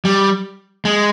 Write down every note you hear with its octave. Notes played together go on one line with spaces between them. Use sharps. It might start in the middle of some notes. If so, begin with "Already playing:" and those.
G3
G#3